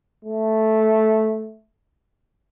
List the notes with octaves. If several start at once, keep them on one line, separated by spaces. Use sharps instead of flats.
A3